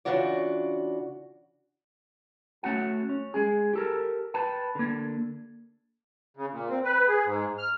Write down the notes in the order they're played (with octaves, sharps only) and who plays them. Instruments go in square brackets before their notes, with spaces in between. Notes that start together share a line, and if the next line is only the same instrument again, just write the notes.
[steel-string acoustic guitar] C#3 E3 D4 F4 F#4 D5
[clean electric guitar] A3 C#4 F#4 F#5
C#4
G#3 G#4
G4 A4 A#4
B4 G5 A5
D3 A#3
[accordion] C#3
A#2
C4
B4
G#4
G#2
F6